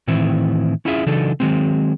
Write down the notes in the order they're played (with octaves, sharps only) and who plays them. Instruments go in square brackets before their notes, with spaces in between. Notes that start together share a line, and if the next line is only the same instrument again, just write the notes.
[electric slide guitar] A2 D#3 E3 C4 E4
C#4 E4 F4 G#4 D#5 E5
C#3 E3 F#3 D4 D#4 A4
D#3 F#3 G#3 C4